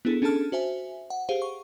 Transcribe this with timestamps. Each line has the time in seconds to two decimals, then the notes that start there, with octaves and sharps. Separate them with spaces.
0.05 B3 D4 E4 G#4 A4
0.22 C#4 D4 G#4 A4 A5 F6
0.52 F#4 C5 E5 G#5
1.10 F#5
1.29 G4 G#4 C5 F5
1.42 C#6